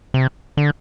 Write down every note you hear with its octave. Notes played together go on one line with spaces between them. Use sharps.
C3
D3